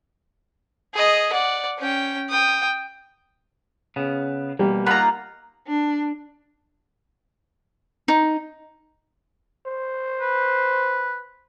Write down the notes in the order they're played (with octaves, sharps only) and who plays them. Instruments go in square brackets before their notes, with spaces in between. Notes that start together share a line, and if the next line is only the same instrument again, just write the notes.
[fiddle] G#4 D#5
D5 F#5
C#4 G5
G5 D#6
[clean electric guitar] C#3 B3
[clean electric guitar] B2 A#3 [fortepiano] G3
[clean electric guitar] A#3 D#4 F4 [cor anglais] F#5 [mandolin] A#5 B5
[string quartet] D4
[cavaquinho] D#4
[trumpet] C5
[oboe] B4